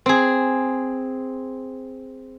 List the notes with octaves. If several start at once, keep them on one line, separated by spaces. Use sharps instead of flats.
C4 G#4